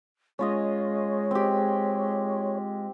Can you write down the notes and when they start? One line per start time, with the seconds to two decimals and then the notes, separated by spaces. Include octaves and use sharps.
0.39 G#3 C#4 F4 C#5 D#5
1.31 C4 G4